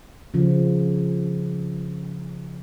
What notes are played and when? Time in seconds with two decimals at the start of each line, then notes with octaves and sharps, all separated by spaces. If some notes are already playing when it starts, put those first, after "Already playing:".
0.34 C#3 F3